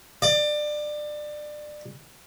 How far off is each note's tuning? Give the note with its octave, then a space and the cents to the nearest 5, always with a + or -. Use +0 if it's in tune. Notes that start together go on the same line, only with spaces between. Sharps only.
D5 +25